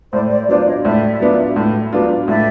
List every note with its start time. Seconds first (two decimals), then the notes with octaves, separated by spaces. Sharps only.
0.13 A2 C5 D5
0.30 C5 D5
0.48 F#3 B3 D4 F4 C5 D5
0.66 C#5 D#5
0.85 A2 D5 E5
1.20 F#3 B3 D4 F4
1.56 A2
1.93 F#3 B3 D4 F4
2.28 A2 D5 E5